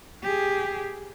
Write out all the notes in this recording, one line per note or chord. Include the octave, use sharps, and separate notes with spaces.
G4 G#4